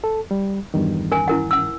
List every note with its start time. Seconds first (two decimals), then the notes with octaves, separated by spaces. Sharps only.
0.04 A4
0.31 G3
0.74 E2 G2 D#3
1.12 A#4 G#5
1.28 E4 A#4 F#5
1.51 F#5 E6